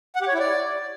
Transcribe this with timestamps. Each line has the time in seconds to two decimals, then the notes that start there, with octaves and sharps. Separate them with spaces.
0.15 F#5
0.21 G4
0.27 C#5
0.34 E4
0.40 D5